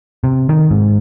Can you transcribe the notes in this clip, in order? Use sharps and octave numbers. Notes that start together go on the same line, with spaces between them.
C3
D#3
G#2